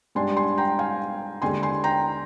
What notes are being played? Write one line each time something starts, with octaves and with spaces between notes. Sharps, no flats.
G#2 G3 D4 G#5 C6
G#5 C6
G5 A#5
F5 G#5
D#2 D3 G#3 G#5 C6
G#5 C6
G5 A#5